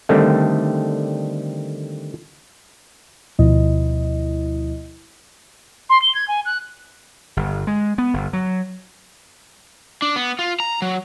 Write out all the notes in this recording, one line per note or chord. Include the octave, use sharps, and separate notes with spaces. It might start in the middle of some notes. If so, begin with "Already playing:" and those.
D3 D#3 G3 A3 C4
D2 B2 F3 E4 D#5
C6
G7
G#6
G#5
F#6
G1
G#3
B3
G1
F#3
D4
B3
F4
A#5
F#3